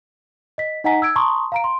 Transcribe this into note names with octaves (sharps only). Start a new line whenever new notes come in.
D#5 B6
D#4 D#5 F#5 G#5 A#5 B6
E6 G#6 D7
A5 A#5 C6 C#6 D#6
F5 A#5 D7
C6